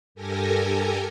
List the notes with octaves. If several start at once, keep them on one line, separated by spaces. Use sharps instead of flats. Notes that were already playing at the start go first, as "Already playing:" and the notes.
G2 G4 A4 A#4 G#5 A#5